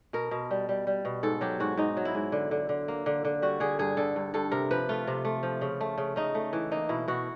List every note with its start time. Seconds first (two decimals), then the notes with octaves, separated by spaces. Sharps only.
0.13 B2 A#4
0.31 B2
0.51 G3
0.69 G3
0.87 G3
1.05 B2
1.23 G#2 A4
1.41 F#3 G4
1.60 G#2 F#4
1.77 G#2 D#4
1.97 F#3
2.05 E4
2.15 G#2
2.32 D3
2.51 D3
2.69 D3
2.88 A#3
3.06 D3
3.25 D3
3.42 G3 F#4
3.60 D3 G#4
3.79 G2 G#4
3.97 D3 A4
4.16 G2
4.34 G2 A4
4.51 C3 A#4
4.71 F3 B4
4.89 A3 F4
5.07 C3
5.25 A3
5.43 F3
5.61 C#3
5.81 A3
5.98 C#3
6.16 C#3 D#4
6.35 A3
6.53 E3
6.71 A#3 D#4
6.89 B2 E4
7.08 B2 F#4